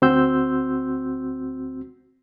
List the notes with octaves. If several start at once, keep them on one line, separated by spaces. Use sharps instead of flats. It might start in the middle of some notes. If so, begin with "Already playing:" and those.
D2 C4 F#4 C6 E6 G6